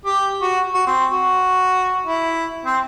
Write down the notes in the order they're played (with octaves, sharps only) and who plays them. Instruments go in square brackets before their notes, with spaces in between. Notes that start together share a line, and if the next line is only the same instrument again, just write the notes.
[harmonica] G4
F#4
F#4
C4
F#4
E4
C4